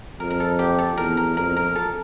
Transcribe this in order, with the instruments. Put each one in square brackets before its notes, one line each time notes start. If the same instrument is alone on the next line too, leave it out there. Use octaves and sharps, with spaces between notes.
[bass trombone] F2 [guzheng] A#4
[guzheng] A#4
A4
G4
A4
[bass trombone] E2 [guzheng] A#4
[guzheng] A#4
[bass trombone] F2 [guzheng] A#4
[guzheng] A#4
A4